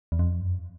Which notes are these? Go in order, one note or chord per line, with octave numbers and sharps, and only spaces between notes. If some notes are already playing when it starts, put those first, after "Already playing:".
E2
F2
F#2